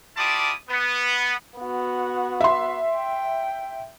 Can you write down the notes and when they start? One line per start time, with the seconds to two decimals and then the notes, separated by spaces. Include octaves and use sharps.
0.17 E4 F4 G4 D5 A5 D#6
0.69 B3
1.58 B3 F#4
2.41 E5 C6
2.95 G5